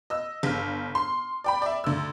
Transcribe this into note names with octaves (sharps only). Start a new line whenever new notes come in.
D#5 E6
G1 F6
C6
D5 G5 B5
D5 E5
D2 E6